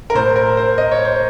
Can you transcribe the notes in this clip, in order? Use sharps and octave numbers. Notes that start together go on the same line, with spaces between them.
A#4
A2 C5
A#4
C5
D#5
C#5
C5